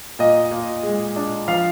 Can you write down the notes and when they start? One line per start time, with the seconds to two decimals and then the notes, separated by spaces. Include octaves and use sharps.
0.19 A#2 D#5
0.51 A#2
0.83 G#3
1.16 D4
1.48 F3 F5